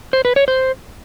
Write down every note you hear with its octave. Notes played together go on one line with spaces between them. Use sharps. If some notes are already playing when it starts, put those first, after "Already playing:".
C5
B4
C#5
C5